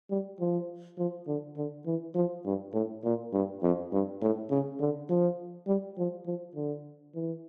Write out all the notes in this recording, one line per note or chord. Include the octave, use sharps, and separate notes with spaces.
G3
F3
F3
D3
D3
E3
F3
G2
A2
A#2
G2
F2
G2
A2
C#3
D3
F3
G3
F3
F3
D3
E3